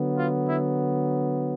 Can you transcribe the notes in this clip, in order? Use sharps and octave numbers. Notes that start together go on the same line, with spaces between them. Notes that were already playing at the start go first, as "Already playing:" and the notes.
Already playing: D3 F#3 B3
F4
E4